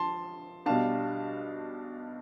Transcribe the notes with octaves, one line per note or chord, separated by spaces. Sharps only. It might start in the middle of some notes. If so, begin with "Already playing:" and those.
Already playing: F3 A5 C6
B1 B2 G3 D4 F5 A5